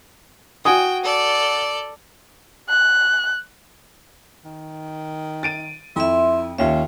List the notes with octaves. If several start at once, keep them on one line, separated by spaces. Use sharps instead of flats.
F#4 G5 G#5 D#6
A4 D5
F#6
D#3
A6 D7 D#7
F2 E4 E5 C6
D#2 C#4 F4 E5